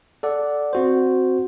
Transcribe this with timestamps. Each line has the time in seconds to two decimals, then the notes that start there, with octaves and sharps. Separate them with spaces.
0.23 A4 D5 F#5
0.73 C4 F#4 C5